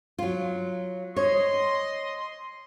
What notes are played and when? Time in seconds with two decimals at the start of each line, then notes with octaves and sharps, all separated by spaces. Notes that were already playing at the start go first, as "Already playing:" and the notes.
0.18 F#3 F4
1.16 C#5 D#5 C6